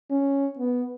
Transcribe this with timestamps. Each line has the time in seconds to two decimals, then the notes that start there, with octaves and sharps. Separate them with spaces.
0.10 C#4
0.59 B3